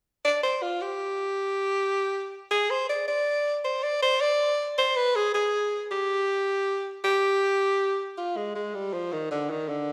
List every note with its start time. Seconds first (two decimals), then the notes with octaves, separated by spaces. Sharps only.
0.25 D5
0.43 C5
0.62 F4
0.81 G4
2.51 G#4
2.70 C5
2.89 D5
3.08 D5
3.64 C5
3.83 D5
4.02 C5
4.21 D5
4.78 C5
4.96 B4
5.16 G#4
5.34 G#4
5.91 G4
7.04 G4
8.17 F4
8.36 G#3
8.55 G#3
8.74 G3
8.93 F3
9.12 D#3
9.31 D3
9.50 D#3
9.69 D3